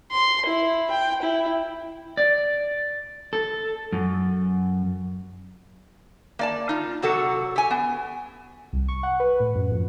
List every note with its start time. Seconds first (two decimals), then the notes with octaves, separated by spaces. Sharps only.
0.11 C6
0.46 E4
0.90 G5
1.22 E4
2.17 D5
3.33 A4
3.92 F#2
6.39 A#3 D5 A5
6.69 D#4 F4
7.02 C3 F#3 F#4 A4
7.56 G4 G#5
7.71 B3
8.73 C2
8.88 C#6
9.03 F#5
9.20 B4
9.40 A2
9.55 F#2
9.71 F2